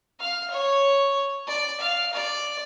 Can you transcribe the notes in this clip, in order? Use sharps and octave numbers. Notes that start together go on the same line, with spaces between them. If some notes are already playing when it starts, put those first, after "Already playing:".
F5
C#5
D5
F5
D5